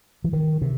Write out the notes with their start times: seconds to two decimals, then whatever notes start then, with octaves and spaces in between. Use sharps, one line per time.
0.24 E3
0.33 D#3
0.62 C3